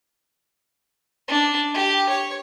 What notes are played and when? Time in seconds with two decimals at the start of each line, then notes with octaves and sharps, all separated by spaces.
1.28 D4
1.74 G4
2.09 C#5